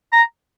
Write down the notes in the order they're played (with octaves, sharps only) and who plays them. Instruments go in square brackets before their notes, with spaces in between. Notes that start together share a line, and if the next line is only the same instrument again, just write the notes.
[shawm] A#5